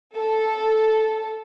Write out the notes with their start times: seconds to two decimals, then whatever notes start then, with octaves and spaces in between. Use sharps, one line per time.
0.18 A4